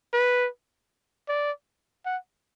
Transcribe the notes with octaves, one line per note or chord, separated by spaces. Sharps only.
B4
D5
F#5